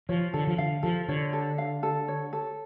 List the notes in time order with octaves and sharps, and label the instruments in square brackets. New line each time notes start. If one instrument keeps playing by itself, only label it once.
[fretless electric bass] F3 [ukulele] C#5
[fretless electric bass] D3 [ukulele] A4
[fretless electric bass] F3
[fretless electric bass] D3 [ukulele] F5
[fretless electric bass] F3 [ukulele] A4
[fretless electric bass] D3 [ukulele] C#5
[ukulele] A4
F5
A4
C#5
A4